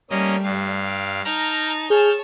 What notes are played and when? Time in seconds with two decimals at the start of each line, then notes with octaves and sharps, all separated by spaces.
0.10 G3 A3 A#3 C#4 D#5
0.43 G2 F5
0.84 D6
1.25 D#4 G5 A5 A#5 F6
1.90 G#4 C#5 A5 F6 G6